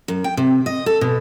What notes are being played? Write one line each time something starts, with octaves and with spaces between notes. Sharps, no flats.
F#2
G5
C3
D#5
A4
B2